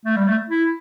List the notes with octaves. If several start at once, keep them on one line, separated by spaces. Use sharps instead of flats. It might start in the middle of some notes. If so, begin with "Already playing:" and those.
A3
G3
A3
E4